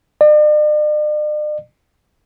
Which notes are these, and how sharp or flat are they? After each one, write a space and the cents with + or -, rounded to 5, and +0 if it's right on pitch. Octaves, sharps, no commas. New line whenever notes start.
D5 +45